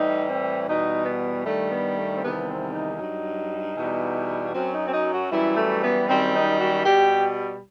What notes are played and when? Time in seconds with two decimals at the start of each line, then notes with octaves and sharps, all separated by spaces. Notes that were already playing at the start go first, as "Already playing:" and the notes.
Already playing: A2 E3 G3 D#4
0.28 C4
0.66 E2 B2 G3 D#4
1.05 B3
1.43 G2 D#3 G3 A3
1.69 B3
1.95 A3
2.15 C4
2.21 E2 C3 D#3 G3 B3
2.47 C4
2.72 D#4
2.98 G2 F#3
3.75 E2 B2 G3
4.52 F#2 F#3 C4
4.72 D#4
4.85 C4
4.91 D#4
5.10 F#4
5.29 F#2 E3 G3 E4
5.55 A3
5.80 B3
6.06 F#2 D#3 G3 C4
6.32 D#4
6.58 F#4
6.83 B2 G3 G4